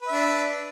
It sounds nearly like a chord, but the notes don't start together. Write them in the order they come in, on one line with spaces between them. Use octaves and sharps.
B4 E5 D4